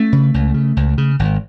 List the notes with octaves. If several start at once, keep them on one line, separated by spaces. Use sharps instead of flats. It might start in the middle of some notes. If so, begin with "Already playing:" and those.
Already playing: A3 C#4
C#3
C#2
C#3
C#2
C#3
G#1